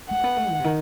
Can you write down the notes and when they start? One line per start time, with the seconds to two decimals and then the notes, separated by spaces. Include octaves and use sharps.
0.10 A3 F#5
0.24 B3
0.37 A3
0.51 D#3
0.60 C3
0.64 D#3